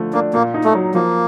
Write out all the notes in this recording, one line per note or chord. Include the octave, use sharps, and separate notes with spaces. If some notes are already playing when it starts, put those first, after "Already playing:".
Already playing: D3 F3 A3
A#3 D4
A#2 A#3
D#4
A3
F#3
F3 A#3